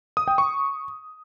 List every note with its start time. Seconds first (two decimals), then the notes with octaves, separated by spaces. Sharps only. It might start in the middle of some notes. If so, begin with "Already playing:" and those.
0.17 D#6
0.28 G5
0.38 C#6